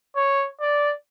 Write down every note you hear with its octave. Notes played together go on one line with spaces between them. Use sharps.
C#5
D5